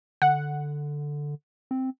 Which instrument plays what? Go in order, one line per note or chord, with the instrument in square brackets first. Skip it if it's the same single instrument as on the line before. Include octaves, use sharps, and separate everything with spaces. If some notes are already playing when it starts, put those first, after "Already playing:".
[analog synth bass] D3 [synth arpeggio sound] F#5
[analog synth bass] C4